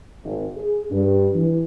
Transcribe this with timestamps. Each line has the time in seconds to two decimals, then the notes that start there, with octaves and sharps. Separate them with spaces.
0.24 G#1
0.57 G#4
0.91 G2
1.35 E3